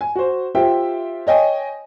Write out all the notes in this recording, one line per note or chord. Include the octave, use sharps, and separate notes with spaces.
G#5
F#4 C5
F4 G4 C5 E5 G5
C#5 D#5 G5 G#5